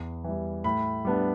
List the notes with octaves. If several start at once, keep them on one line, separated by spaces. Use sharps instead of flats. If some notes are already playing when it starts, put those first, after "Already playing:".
Already playing: E2
E3 G3
A2 B5
G3 B3 D4